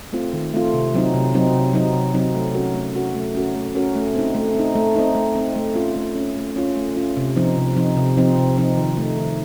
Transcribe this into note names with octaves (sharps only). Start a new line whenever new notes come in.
A3 C4 F4
D#3
A3 C4 F4
C3
F#3 C4 D#4
C3
F#3 C4 D#4
C3
F#3 C4 D#4
C3
F#3 C4 D#4
A3
C#4 F#4 A#4
A3
C#4 F#4 A#4
A3
C#4 F#4 A#4
A3
C#4 F#4 A#4
A3
C4 D#4
A3
C4 D#4
A3
C4 D#4
A3
C4 D#4
A3
C#4 F4
A3
C#4 F4
A3
C#4 F4
A3
C#4 F4
C3
F3 C4 D#4
C3
F3 C4 D#4
C3
F3 C4 D#4
C3
F3 C4 D#4
D#3
A3 D#4
D#3